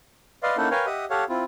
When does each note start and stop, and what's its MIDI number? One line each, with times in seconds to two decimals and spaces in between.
0.43 0.56 71
0.43 0.56 74
0.43 0.56 75
0.43 0.56 77
0.43 0.56 84
0.57 0.69 58
0.57 0.69 61
0.57 0.69 63
0.57 0.69 64
0.57 0.69 69
0.57 0.69 78
0.71 0.86 70
0.71 0.86 71
0.71 0.86 73
0.71 0.86 77
0.71 0.86 79
0.71 0.86 80
0.86 1.05 67
0.86 1.05 75
0.86 1.05 76
0.86 1.05 78
0.86 1.05 87
1.10 1.24 67
1.10 1.24 69
1.10 1.24 73
1.10 1.24 77
1.10 1.24 78
1.29 1.44 60
1.29 1.44 64
1.29 1.44 65